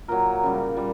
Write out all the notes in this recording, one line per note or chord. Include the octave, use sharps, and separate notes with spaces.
A#2 F#3 A#4
C#3 G3
A#2 G3